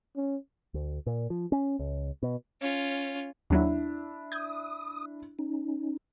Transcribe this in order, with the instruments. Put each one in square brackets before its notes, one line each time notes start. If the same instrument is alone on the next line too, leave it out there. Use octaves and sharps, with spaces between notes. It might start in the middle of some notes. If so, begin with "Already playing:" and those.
[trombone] C#4
[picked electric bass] D2
A#2
F3
C#4
C#2
B2
[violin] C#4 F4
[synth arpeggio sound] D#2 F#3 [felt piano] D4 E4
[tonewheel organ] D#6 [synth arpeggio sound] G6 G#6
[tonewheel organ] C#4 D#4